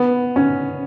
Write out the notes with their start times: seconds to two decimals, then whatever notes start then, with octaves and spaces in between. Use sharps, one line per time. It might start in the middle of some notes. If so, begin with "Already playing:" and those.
Already playing: B3
0.36 C#4